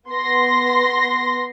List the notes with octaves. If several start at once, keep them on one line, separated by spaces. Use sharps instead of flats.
B3 C6 A#6